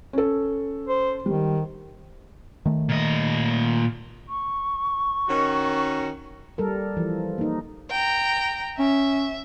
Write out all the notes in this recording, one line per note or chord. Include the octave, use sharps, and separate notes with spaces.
C#4 A4
C5
D#3 G3
D#3 A3
A#2 D#5
C#6
D#3 C#4 F#4
G3 A4 A#4
E3 F3
A#3 D#4
G5 A#5
C#4 E5